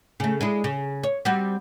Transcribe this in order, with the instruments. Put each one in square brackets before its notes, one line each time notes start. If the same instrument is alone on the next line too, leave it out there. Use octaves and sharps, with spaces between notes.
[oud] C#3 A3
G#3 D4 E4
C#3
C#5
G3 C4 F#4